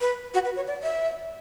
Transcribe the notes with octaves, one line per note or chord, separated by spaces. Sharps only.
B4
F#4
B4
C#5
D5
E5